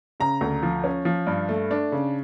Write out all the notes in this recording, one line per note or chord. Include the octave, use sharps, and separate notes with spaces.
C#3 A#5
D2
F3
C#4
F3
G2
A3
D4
C#3